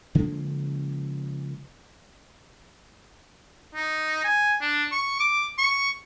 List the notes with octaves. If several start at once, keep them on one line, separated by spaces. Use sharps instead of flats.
C#3 F3 G#3 A#3
D#4
G#5
D4
C#6
D6
C#6